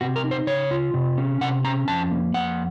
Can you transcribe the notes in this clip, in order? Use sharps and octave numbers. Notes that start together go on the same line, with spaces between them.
C3 F#4
A#4
D#4
C5
C#3 C#5
F4
C3
C#4
C3 F#5
C#4 A#5
F2 A5
A#3
F2 F#5